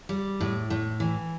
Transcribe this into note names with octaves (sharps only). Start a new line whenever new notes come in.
G3
A2
A2
E3